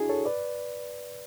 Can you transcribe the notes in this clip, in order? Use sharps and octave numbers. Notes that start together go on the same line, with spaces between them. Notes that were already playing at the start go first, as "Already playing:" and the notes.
Already playing: D4 E4 F#4 G#4
A4 C#5
B4 D5